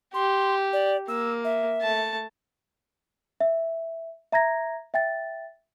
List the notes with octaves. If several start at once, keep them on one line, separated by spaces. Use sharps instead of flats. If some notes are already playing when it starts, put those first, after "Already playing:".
G4 C6
D5
A#3 E6
E5
A3 A5
E5
E5 A#5 G#6 A#6
E5 G5 A6